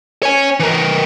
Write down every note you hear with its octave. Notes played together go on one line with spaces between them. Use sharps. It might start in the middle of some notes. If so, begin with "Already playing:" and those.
C#5 G#5
E3 A#4